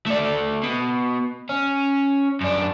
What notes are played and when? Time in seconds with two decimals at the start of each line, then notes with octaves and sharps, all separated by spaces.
0.07 A3 D5
0.63 B2
1.49 C#4
2.41 F#2 D4